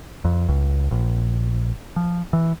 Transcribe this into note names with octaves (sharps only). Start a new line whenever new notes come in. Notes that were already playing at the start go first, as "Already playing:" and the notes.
F2
C#2
A#1
F3
E3